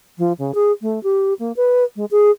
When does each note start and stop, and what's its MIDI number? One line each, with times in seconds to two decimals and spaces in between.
0.18 0.33 53
0.38 0.54 49
0.54 0.72 68
0.82 1.02 57
1.03 1.34 67
1.39 1.52 58
1.57 1.84 71
1.96 2.05 56
2.11 2.31 68